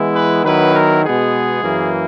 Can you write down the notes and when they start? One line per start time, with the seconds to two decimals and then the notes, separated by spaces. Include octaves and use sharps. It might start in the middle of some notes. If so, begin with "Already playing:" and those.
Already playing: E3 G#3 B3 E4
0.15 B4
0.44 D#3 F#3 B3 E4 B4
0.73 A#4
1.04 B2 G#3 B3 G#4
1.63 F#2 E3 A#3